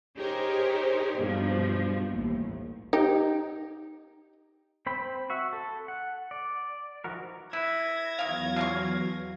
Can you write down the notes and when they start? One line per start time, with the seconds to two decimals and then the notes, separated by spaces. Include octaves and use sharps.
0.17 D#4 G4 G#4 A#4 C5 C#5
1.18 G2 B2 F3
2.08 A1 D#2
2.93 D#4 G4
4.86 C4 C5 G5 B5
5.30 F#4 E5
5.53 A4
5.88 F#5
6.31 D5
7.04 E3 F3 D#4 F#4 A#4
7.53 E4 B4 G#6 A#6
8.19 E2 D#3 E3 F#3 F5
8.56 B2 F4 F5 C#6